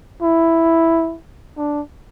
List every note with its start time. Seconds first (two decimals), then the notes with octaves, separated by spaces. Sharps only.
0.22 E4
1.58 D4